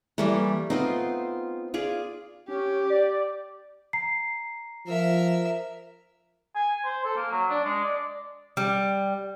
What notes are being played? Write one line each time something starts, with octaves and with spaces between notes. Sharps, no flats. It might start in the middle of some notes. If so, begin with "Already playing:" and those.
E3 G3 A3 A#3
B3 C4 D#4 F4
F4 G#4 D5
C#4 G4
D5
A#5 C7
F3 A#4 E5
G#5
C5
A4
A#3
F#3
D4
G#3
D5
G3